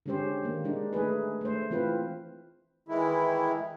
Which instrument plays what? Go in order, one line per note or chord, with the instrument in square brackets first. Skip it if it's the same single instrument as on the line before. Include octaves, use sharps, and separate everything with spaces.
[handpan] D3 G#3 C#4 G4 C5
D#3 A#3
G#3 D4 D#4
A3 D#4 G#4 B4
A3 C5
E3 C4 F4 B4 C5
[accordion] D#3 E3 G#3 E4